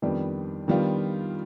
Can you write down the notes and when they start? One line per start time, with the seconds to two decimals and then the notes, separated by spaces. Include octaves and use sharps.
0.02 F2 D#3 G3 B3 D4
0.68 D#3 G3 B3 D4 F4